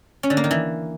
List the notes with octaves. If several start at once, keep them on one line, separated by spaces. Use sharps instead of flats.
C#4
D3
A#3
D#3
E3